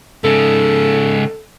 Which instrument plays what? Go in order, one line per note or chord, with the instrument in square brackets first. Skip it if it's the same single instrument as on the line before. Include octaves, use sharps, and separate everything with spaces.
[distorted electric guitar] G#2 C#3 [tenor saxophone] A4